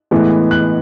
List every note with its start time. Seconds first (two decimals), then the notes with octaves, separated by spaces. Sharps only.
0.11 A2 E3 G#3 B3
0.51 F#6